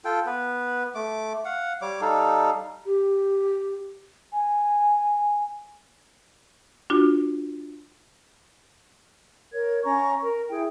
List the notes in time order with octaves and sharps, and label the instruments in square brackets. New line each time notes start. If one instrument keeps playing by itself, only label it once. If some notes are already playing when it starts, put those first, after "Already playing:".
[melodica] F4 A4 G5
B3 B4
A3 D6
F5 F#5
G3 C#5 D6
G3 D#4 A4 F5
[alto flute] G4
G#5
[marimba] D4 F4 F#4
[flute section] A#4 C#5 G#6
C#4 A#5 C#6
A#4
E4 G#4 G5